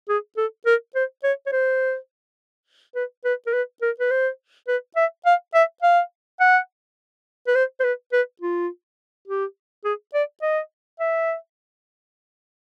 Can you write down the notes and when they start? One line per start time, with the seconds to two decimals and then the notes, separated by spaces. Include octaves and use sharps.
0.09 G#4
0.37 A4
0.66 A#4
0.95 C5
1.24 C#5
1.46 C#5
1.52 C5
2.95 B4
3.25 B4
3.47 A#4
3.53 B4
3.82 A#4
4.00 B4
4.11 C5
4.68 B4
4.96 E5
5.26 F5
5.54 E5
5.83 F5
6.40 F#5
7.47 B4
7.55 C5
7.80 C5
7.84 B4
8.13 B4
8.42 F4
9.28 G4
9.85 G#4
10.14 D5
10.42 D#5
11.00 E5